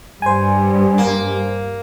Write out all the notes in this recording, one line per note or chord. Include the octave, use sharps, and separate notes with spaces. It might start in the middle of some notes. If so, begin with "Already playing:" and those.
G2 C5 G#5
A#3